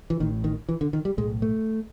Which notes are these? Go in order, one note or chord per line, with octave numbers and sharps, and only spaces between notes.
E3
A1 A2 D#3
D#3
E3
D3
D#3
G3
B1 A2 G#3
A3